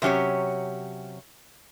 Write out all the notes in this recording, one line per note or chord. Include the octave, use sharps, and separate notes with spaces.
C3 F#3 C#4 G4 C#5